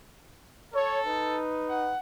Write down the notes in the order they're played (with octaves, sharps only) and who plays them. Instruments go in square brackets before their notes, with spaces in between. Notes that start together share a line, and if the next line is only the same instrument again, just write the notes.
[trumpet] A4 [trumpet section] C#5
[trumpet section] D#4 B4
[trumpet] F#5